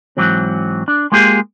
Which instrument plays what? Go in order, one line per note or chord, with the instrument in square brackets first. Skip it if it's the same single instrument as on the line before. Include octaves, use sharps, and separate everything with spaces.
[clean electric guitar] G#2 E3 F#3 C4
D4
G#3 A#3 F4 G4 G#4